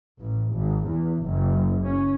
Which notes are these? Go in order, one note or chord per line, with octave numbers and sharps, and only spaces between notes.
A1
G#1
E2
F#1
C#4